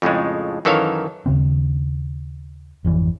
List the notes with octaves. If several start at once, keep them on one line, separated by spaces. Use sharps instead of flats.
F2 A2 C#3 G#3
F#2 D#3 E3 A4 C#5 F5
D#2 C#3 C4
G#1 F2 E3